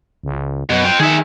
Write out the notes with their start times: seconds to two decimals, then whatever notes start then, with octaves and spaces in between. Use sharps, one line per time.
0.23 C#2
0.70 F#2 B2
0.85 F4 G5
1.00 D#3 G#4 E5